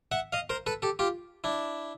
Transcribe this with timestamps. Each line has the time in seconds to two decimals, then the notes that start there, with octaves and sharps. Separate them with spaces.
0.12 E5 F#5
0.33 D#5 F5
0.50 A#4 C5
0.66 A4 B4
0.82 G4 A4
0.99 F4 G4
1.44 D4 E4